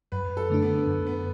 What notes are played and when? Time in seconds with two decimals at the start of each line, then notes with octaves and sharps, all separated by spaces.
0.12 F#2 B4
0.37 A4
0.50 D3 A3 D4
0.62 B3
0.87 F#2
1.07 B3